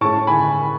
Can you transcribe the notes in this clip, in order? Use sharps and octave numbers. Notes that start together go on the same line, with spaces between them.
A2 G#3 C#4 A5 C#6
G#5 B5